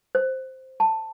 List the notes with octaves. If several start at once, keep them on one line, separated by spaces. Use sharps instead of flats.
C5
A5